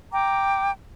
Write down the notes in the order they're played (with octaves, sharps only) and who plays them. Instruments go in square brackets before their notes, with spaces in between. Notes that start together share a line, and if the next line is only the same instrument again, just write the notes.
[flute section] G5 A#5 D6